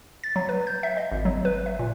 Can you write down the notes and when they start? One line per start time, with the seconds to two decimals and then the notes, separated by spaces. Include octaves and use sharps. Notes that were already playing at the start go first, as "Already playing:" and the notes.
0.24 A6
0.36 F#3
0.49 B4
0.67 G6
0.83 E5
0.97 D#5
1.12 G#1
1.25 F#3
1.45 B4
1.66 E5
1.79 A#2